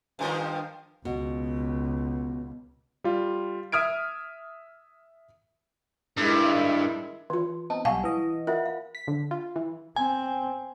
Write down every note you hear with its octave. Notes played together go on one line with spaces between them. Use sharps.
G2 D#3 F3
C#2 B2
G3 F4
E5 D#6 F6 G#6 D7
G2 D#3 G#3 E4
E3 F4
B3 C4 D#4 A5
B1 G3 F5 F#5 G#5 A5 C#6
E3 B4 D#5
F4 A#4 E5 F#5
F5
B6
D3
F4
E3
C4 G#5